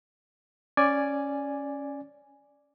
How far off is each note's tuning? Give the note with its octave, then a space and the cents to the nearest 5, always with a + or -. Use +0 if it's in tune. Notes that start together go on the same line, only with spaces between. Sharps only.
C#4 +0 D5 +0 G#5 +0